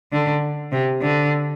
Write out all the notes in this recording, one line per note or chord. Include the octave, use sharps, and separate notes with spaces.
D3
C3
D3